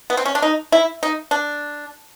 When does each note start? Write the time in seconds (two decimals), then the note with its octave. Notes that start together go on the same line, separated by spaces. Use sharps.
0.10 B3
0.17 C4
0.26 C#4
0.35 D4
0.42 D#4
0.72 E4
1.03 D#4
1.31 D4